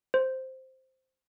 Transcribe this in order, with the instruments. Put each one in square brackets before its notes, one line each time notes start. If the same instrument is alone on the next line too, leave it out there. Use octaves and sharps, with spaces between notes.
[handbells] C5